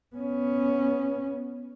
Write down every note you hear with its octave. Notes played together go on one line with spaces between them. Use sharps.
B3 C#4